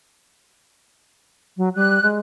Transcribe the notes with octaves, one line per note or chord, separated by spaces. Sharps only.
F#3
G3 F#6
G#3